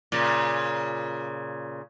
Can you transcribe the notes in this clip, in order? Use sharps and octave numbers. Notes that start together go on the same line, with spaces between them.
A#2 C#3